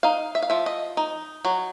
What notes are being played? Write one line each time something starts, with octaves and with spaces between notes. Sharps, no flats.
D#4 F5
E5
F5
F3 E5
D#5
D#4
F#3